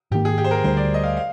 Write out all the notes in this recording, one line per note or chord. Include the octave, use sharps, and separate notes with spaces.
G#2 D#3 A#3 G4
G#4
G4
C5
A#4
D2 D3 G3 C5
D5
D#5
F5
F5